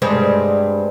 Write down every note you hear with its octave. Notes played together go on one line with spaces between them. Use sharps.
G2 G#3 C4